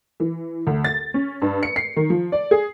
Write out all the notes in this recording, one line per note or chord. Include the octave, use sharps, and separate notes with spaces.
E3
D2
A6
C#4
G2
C#7
C7
D#3
F3
D5
G#4